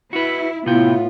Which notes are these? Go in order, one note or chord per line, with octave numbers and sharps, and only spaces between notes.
E4 F#4 B4
A2 C3 B3 E4 F4 G5